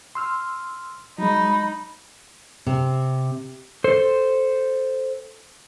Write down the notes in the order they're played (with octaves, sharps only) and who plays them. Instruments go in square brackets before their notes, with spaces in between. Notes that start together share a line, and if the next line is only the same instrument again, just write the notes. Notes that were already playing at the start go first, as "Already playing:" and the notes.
[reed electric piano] C6 E6 F6
[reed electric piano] F#3 G#3 [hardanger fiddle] D#4 [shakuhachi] B5
[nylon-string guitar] C3
[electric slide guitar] A4 C5